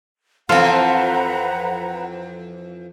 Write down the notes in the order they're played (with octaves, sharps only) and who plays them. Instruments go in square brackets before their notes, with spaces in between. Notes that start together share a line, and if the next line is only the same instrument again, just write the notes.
[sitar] F2 E3 [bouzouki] C4 A4 [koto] F4 [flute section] B4 F#5 A#5